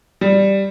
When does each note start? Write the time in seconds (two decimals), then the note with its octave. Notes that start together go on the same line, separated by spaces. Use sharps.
0.21 G3